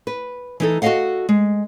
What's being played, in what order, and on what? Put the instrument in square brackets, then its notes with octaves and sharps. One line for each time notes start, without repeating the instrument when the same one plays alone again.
[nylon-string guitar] B4
E3 D#4 A4
F#4 A4 A#4 D#5 F5 F#5
G#3